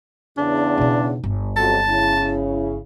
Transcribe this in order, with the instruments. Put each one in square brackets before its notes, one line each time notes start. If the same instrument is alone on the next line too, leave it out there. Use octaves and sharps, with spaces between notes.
[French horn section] E2 C#3 [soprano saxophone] D4
[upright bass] B2 D#4
G1
[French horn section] F2 C3 F#3 [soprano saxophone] A5
[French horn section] C#3 E4